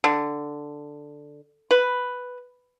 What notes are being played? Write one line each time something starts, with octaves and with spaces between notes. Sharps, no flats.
D3
B4